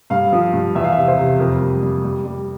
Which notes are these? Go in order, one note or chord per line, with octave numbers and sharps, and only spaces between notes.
G2 F5
F3
G2
E2 E5
F5
C3 E5
C5
C3
F2 A#4
G3
G3
G3
G3